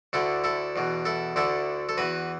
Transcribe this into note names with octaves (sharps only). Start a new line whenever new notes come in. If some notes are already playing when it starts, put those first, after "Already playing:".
D2 D3 E4 A4
E4 A4
E2 B2
E4 A4
D2 D3 E4 A4
A4
E2 E3 F#4 B4